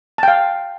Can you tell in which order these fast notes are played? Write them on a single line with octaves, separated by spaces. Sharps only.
A5 G5 F5